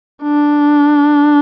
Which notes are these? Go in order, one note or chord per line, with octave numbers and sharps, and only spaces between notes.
D4